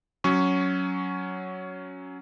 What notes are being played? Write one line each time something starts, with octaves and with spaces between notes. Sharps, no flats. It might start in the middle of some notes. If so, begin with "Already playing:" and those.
F#3 C#4 C#6